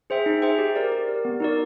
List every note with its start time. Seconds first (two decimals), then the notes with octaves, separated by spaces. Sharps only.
0.10 G#4 C5 E5 G5
0.26 D#4
0.42 G#4 C5 E5 G5
0.59 G4
0.76 A#4 D5
0.92 G4
1.08 A#4 D5
1.25 B3
1.40 D#4 F#4 A#4 D5